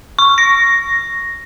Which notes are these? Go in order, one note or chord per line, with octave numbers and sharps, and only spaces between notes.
C#6
A#6